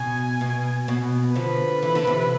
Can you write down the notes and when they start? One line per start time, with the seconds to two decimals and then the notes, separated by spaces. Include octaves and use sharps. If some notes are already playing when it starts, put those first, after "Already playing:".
Already playing: B2 G#5
0.41 B2
0.88 B2
1.35 D3 F3 B4
1.82 E3
1.95 D3
2.07 C3 E3